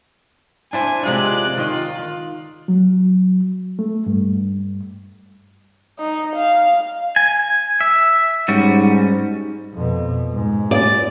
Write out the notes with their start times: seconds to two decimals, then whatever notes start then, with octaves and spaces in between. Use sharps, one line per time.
0.73 D4 E4 C5 G#5
1.05 C3 G#3 F4 D5 F#6
1.58 D#3 F4 D#5
2.68 F#3
3.79 A3
4.06 G2
5.99 D#4
6.36 F5
7.16 G#5
7.81 E5
8.48 G#2 G3 C#4 F#4
9.73 F2 B2
10.32 G#2
10.71 D5